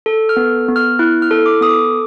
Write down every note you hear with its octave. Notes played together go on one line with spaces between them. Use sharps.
A4
F6
B3
B3
F6
E4 F#6
F6
A4
D6
B3 D#6
D6